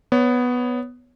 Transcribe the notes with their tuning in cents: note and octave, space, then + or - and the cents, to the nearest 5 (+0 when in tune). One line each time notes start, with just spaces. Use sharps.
B3 +0 C#5 +10